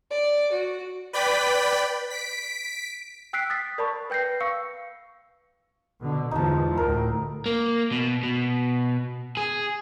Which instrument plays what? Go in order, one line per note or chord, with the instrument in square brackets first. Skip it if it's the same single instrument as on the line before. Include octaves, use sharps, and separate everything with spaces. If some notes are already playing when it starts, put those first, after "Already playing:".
[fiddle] D5
F#4
[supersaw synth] B4 D5 G5 B5 B6
B6 D7
[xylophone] G5 E6 F#6 B6 C7 D7
D#6 A6 B6
A#4 D5 A5 B5 C#6
B4 G5 G6 A#6 C7
F5 C#6 E6 C#7
[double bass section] B2 D3
[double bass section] E2 G#2 F3 [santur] D#4 A5
[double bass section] D2 A2 [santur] A#4
[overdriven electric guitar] A#3
B2
B2
G#4